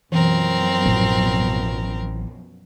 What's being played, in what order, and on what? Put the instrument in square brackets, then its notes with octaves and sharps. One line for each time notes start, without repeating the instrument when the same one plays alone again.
[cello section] F#2 B2 F3 [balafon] E3 [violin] C4 A#4
[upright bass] A1